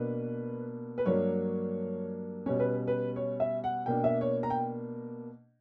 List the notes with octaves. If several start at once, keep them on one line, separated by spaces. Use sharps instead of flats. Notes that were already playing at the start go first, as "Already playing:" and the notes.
Already playing: B2 A#3 D4 B4
B4
G2 F#3 A#3 D4 C#5
B2 G3 C#4 C#5
B4
B4
C#5
E5
F#5
B2 A#3 D4 G5
E5
C#5
A#5
G5